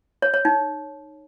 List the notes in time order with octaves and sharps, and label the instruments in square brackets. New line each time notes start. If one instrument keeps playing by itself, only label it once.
[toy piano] C#5
C#5
D#4